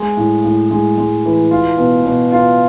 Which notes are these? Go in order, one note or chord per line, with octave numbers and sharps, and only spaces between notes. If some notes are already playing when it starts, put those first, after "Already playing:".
Already playing: G#3
A2
A2
G#3
G#3
E3
F4
B2
B2
F4